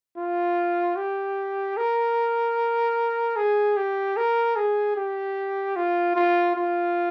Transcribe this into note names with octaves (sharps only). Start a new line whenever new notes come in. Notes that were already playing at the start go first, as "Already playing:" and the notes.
F4
G4
A#4
G#4
G4
A#4
G#4
G4
F4
F4
F4